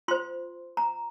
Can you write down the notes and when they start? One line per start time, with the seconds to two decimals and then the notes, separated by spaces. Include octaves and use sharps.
0.08 F4 C5 C6
0.77 A#5